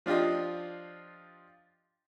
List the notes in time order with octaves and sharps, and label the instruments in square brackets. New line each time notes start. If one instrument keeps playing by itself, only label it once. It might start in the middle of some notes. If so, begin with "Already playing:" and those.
[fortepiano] F3 D4 F4 G4 D#5